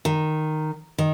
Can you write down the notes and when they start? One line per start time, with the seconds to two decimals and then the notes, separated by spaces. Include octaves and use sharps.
0.05 D#3
0.98 D#3